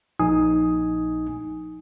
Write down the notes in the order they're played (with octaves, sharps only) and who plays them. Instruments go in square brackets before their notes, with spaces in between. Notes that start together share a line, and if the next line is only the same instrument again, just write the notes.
[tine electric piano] A#1 D#4 G#5 D#6